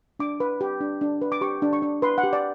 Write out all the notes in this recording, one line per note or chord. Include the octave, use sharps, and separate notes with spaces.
D4 D6
B4
G4
D4
D4
B4
D6
G4 C#6
D4
C#6
D4
B4 C6
F#5
G4
D5